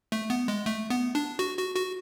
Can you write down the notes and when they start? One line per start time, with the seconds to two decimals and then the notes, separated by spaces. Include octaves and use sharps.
0.12 A3
0.30 B3
0.48 G#3
0.66 A3
0.90 B3
1.15 D4
1.39 F#4
1.58 F#4
1.76 F#4